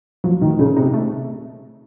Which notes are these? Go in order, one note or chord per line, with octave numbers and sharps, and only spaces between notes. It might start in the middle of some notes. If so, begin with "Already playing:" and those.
F3 F#3
D#3 A3
A#2 C#3
C3 D#4
A3